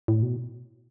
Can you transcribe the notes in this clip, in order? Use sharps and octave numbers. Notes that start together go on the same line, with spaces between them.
A2
B2